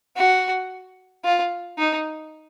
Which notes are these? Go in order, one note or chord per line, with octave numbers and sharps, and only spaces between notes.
F#4
F4
D#4